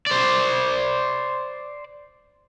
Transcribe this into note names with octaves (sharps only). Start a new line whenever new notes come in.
C5 D5